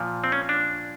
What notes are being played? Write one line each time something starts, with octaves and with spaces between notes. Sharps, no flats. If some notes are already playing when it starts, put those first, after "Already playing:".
Already playing: A#2 F3
C4
C#4
D4